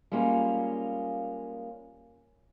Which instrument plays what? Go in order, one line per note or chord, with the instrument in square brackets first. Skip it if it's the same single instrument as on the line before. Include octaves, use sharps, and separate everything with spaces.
[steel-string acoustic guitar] G3 G#3 A#3 C#4 F4